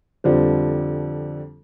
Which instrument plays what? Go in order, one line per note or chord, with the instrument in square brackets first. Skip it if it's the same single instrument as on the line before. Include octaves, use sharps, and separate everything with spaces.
[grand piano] F2 D3 F3 G3